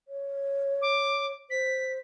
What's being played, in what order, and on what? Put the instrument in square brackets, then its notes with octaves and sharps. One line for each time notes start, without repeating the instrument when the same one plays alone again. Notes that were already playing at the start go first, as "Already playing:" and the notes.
[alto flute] C#5
[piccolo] D6
[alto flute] C5 [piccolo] B6